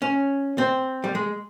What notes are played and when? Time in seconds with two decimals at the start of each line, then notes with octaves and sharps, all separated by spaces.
0.02 C#4
0.58 C4
1.04 G3
1.15 G#3